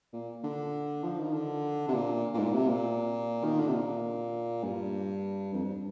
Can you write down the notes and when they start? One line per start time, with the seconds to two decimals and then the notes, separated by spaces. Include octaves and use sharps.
0.13 A#2
0.44 D3
1.04 F3
1.19 D#3
1.33 D3
1.88 C3
1.94 A#2
2.34 A#2
2.39 G#2
2.46 A#2
2.54 C3
2.69 A#2
3.44 D#3
3.59 D3
3.68 C3
3.74 A#2
4.64 G2
5.54 F2
5.64 G2